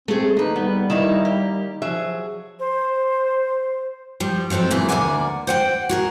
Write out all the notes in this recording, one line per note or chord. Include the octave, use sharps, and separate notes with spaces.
A3 C4 G#4
D#2 D#4 B4
G3 B3
D#3 A#3 D#4 E4 C#5
G4
F3 F#3 G#4 E5
C5
F3 G3
F3 F#3 C4 D#4 A4
E2 A#2 E3 G#4
D2 G2 A#3 D5 F#5 G#5
C5 F#5 G5
F#4 G#4 A#4